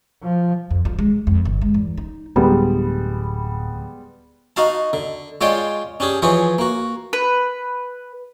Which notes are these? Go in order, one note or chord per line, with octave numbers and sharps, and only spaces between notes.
F3
F2
F3
G#3
F2
G1
G#3
E2
D#4
D1 G3 G#3 B3
D#4 F#4 F5 A5
D3
G#3 F4 C#5 D5 F5 G5
C#4 D4 G4 G#4
E3 F3 G#4 C5 C#5
A#3 F#4
B4